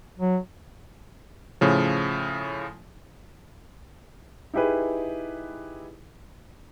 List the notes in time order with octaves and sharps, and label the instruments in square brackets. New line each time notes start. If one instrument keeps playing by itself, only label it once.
[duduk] F#3
[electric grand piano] A2 C#3 F3
[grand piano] D#4 E4 G4 G#4 B4